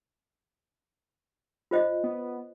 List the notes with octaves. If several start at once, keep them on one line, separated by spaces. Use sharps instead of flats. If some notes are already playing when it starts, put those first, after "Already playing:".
F4 C5 D#5
B3